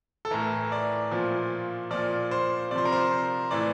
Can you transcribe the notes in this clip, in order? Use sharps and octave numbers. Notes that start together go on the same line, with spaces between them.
A4
A2 E3 A#4
D5
A#2 F3
A#2 F3 D5
C5
C3 F3 C5 D5
A#4
C5
A2 E3 D5